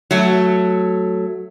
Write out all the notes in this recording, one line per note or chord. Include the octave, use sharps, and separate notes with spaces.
F#3 A3